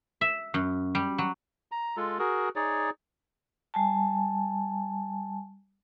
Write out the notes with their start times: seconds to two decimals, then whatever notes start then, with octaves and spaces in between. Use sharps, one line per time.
0.21 E5
0.54 F#2
0.95 G3
1.18 F#3
1.72 A#5
1.97 G#3 F4 A4
2.19 F#4 G#4 A#4
2.56 D#4 G#4 C#5 D5
3.74 G3 G#5 A5